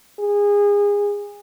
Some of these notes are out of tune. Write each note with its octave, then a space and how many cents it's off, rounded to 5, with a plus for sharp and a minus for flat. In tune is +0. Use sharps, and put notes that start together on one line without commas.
G#4 -25